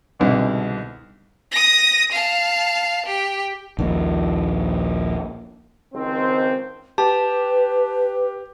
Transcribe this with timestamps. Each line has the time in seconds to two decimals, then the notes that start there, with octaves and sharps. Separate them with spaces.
0.19 C2 G#2 B2 D3
1.51 D#6 A#6
2.12 F5 A5
3.06 G4
3.79 A#1 D#2 A#2
5.94 C#2 D#3 C4
6.98 G4 B4 A5